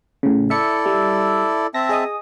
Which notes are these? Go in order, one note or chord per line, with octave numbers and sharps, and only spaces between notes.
A2 C#3
E4 A4 D5 E5 C#7
G3
C4 E5 A5 A#6
G#4 D#5 D#6